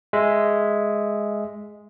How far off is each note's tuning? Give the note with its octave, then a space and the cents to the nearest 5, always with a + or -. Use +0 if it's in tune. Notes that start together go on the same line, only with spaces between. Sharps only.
G#3 +0 E5 +0